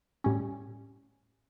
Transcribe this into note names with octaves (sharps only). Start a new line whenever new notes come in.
A2 G3 C#4